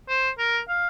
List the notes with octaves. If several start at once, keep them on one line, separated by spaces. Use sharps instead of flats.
C5
A#4
F5